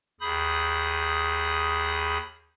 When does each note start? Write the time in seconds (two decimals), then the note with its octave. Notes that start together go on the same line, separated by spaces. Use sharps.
0.21 D#2 G#4 B5 D#6 G6